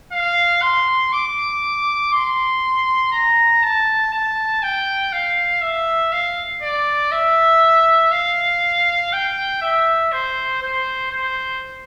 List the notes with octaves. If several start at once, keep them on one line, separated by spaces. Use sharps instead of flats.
F5
C6
D6
C6
A#5
A5
A5
G5
F5
E5
F5
D5
E5
F5
G5
E5
C5
C5
C5